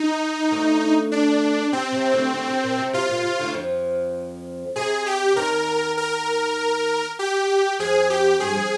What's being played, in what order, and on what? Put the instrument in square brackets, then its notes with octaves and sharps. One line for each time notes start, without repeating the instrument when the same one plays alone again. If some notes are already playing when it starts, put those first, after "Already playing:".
Already playing: [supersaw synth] D#4
[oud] D2 D3
[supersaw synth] D4
[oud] C3 [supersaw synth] C4
[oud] C3
D2 D3
D2 D3
C3
A#2
C3
[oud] C3 [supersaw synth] F4
[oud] A#2
C3
D2 D3
F2 F3
[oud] C3 [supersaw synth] G#4
[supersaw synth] G4
[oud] D#2 D#3 [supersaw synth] A#4
[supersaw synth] A#4
G4
[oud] F2 F3 [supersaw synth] G#4
[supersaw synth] G4
[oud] G2 G3 [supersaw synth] G#4
[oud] F3